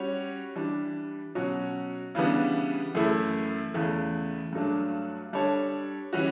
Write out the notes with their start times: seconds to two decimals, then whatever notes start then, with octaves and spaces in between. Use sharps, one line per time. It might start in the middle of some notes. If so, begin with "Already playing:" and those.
Already playing: G3 C#4 F#4 C#5
0.56 E3 G3 D4
1.35 B2 F#3 C#4 F#4
2.15 C#3 E3 G3 B3 D4
2.95 F#2 E3 A3 E4
3.74 E2 C#3 E3 A3
4.53 G2 F#3 A3 D4
5.33 G3 D4 A4 C#5
6.13 E3 G3 C#4 F#4